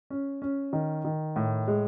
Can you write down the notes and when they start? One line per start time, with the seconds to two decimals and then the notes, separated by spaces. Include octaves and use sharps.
0.10 C#4
0.42 C#4
0.73 D#3
1.04 D#3
1.36 A2
1.68 G#3